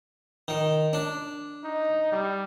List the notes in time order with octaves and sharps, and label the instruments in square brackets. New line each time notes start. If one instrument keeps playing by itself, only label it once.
[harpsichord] D#3
D4
[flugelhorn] D#4
G3